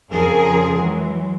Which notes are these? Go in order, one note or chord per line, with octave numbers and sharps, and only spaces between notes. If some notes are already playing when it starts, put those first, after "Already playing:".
F2 C#3 F3 C4 G#4 A#4
E3 F#3 G#3